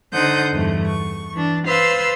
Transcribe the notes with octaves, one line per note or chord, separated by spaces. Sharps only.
D3 D#4 C5 F#5 D#6 G6
E2 G2 A3
C#6
E3 D4
B4 C5 F5 C6 E6 A6